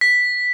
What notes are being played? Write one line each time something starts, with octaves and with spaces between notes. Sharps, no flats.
B6